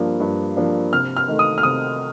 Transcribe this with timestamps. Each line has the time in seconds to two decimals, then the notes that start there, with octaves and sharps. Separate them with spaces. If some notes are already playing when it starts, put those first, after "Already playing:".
Already playing: G2 F3 A#3 D4
0.20 G2
0.57 F3 A#3 D4
0.93 C3 F6
1.17 F6
1.28 D#3 A3
1.39 D#6
1.58 F6
1.63 C3 D#6